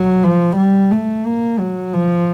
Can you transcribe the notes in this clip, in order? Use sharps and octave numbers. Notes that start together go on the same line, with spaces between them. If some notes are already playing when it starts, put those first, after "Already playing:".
Already playing: F#3
F3
G3
A3
A#3
F#3
F3